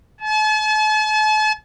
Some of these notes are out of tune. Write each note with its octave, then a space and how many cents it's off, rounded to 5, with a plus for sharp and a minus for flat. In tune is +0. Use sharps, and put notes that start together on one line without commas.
A5 -45